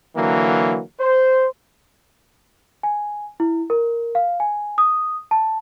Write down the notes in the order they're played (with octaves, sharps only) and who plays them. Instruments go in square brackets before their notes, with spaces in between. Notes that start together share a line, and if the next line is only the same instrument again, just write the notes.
[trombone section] D3 E3 F#3 A#3
C5
[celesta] G#5
E4
A#4
F5
G#5
D#6
A5